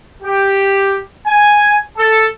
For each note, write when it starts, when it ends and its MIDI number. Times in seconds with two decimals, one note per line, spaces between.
0.22 1.00 67
1.27 1.76 80
1.97 2.26 69